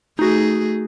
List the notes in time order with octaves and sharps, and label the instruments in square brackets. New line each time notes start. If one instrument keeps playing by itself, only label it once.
[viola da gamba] A3 G#4 [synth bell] D#4 F#4